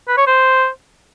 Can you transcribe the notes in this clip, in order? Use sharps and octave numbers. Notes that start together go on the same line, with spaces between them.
B4
C#5
C5